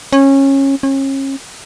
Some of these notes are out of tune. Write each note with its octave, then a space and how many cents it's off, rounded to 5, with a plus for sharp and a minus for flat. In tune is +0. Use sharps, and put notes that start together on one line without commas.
C#4 -20
C#4 -35